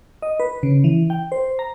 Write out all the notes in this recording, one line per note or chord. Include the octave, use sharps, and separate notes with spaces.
D#5
B4
C#3
E3
G5
C5
A#5